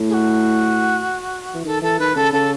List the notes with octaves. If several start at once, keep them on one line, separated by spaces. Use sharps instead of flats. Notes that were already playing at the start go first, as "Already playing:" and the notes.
Already playing: A2
G#4
F#4
E3
D#3 A4
E3 A4
D#3 B4
C#3 A4
C#3 A4